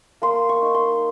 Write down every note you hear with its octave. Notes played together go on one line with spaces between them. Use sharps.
A#3 C6
C#6
D#4
C6